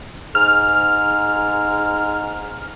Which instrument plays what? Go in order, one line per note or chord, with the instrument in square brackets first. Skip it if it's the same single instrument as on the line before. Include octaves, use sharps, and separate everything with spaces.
[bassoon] G#2 [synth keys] F6